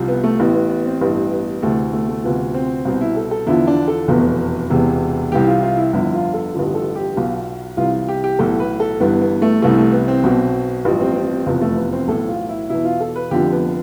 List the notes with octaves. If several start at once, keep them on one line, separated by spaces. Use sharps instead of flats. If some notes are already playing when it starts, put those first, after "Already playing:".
Already playing: C2 C3 F3
B3
A3
A1 A2 E3 B3
B3
B3
C4
A1 G2 E3 B3
B3
D2 C3 E3 A3
A3
A3
D2 C3 F3 B3
C4
C2 B2 C4
E4
A4
A4
E2 D3 F3 E4
D4
A4
F1 E2 B2
E1 E2 C3
C2 C3 E3 G4
F4
F4
E4
G1 F2 D3 E4
F4
A4
A1 G2 D3 F3
A4
G4
B1 B2 F4
C2 C3 E3 F4
F4
G4
G4
B1 A2 E3 A4
B4
A4
G1 G2 E3 B3
B3
A3
C2 C3 E3 A3
A3
B3
C4
B1 B2
A1 G2 F3
C4
C4
C4
F1 E2 C3 F3 B3
A3
B3
C4
B1 A2 E3 A4
F4
E4
E2 B2 E4
F4
A4
B4
F1 F2 D3 F3 G4
B3